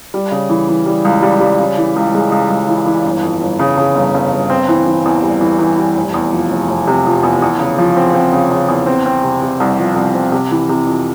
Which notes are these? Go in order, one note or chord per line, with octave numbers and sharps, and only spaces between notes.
G3
C#3
E3
E3
G3
C#2
G3
G3
C#3
E3
C#2
G#3
C#2
C#2
E3
E3
G1
F2
G1
C#3
C#3
G1
G1
G1
C4
E3
E3
E2
G3
E3
E3
G3
F1
E2
F3
F1
F1
C3
F3
E2
E2
C#3
F3
C4
C4
C#3
C#3
E2
C4
C4
C3
C3
C2
F3
C2
C4
C3
E3
C3
F2